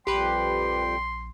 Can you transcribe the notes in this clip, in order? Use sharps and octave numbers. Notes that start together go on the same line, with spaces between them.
A#1 F2 G3 G4 B4 G5 C6